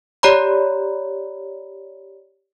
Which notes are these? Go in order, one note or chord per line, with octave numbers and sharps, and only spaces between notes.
G4 C#5 D5 A#5 B5